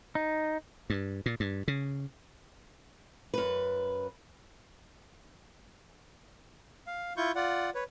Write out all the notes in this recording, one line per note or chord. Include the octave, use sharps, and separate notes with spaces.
D#4
G2
A#2
G2
C#3
F#2 B4
F5
E4 F4 C#6 G6
F4 D5 F#5
B4 C#5